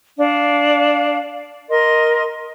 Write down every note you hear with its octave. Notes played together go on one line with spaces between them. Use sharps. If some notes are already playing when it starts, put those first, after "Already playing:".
D4 F5
A#4 D#5 C6